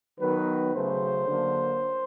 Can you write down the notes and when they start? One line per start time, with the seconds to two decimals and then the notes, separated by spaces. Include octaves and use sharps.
0.20 D#3 F#3 B3 B4
0.74 C#3 F#3 A3 C5
1.27 D3 F#3 A#3